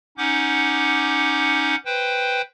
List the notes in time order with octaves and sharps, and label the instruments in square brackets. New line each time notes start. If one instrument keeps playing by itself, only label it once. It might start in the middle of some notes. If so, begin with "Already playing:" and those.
[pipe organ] C#4 D#4 F#5 D6 G6
B4 C5 G5